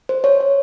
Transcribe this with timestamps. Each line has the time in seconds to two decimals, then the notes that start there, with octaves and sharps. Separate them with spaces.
0.09 C5
0.24 C#5
0.40 C#5